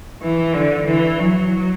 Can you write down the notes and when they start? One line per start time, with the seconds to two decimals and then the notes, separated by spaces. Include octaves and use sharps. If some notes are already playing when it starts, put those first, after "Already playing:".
0.22 E3
0.54 D3
0.86 E3
1.19 F#3